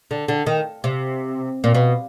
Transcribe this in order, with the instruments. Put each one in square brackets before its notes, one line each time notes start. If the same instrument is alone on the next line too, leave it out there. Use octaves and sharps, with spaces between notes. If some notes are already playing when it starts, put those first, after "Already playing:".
[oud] D3
D3
D#3
C3
A#2
B2